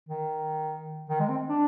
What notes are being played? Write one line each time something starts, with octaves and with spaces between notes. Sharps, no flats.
D#3
D#3
G#3
C4
D4